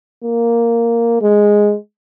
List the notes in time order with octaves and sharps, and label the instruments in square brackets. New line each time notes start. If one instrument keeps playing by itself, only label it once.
[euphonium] A#3
G#3